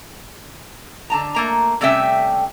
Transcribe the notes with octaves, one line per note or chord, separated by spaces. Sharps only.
D3 A5 A#5
A3 A#3 A#5
C3 G3 A3 C#4 E5 G5